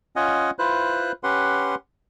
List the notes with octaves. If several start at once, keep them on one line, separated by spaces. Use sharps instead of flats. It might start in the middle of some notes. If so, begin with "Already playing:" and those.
C#4 F4 D#5 F#5 G#5
E4 F4 B4 C5 F#6
C#4 G4 B4 F#5 C6